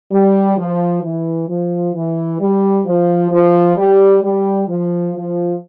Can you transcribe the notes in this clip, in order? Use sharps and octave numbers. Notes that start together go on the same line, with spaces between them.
G3
F3
E3
F3
E3
G3
F3
F3
G3
G3
F3
F3